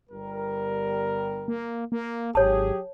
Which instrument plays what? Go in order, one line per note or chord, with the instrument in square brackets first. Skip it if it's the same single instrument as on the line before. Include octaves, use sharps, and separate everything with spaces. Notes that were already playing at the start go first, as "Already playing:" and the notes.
[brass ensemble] G1 G3 A#4
[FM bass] A#3
A#3
[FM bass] G#1 [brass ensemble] F#3 G4 G#4 [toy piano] C#5 A5